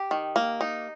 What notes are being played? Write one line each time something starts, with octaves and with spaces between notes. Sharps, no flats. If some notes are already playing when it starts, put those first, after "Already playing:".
Already playing: G4
D#3
A#3
D#4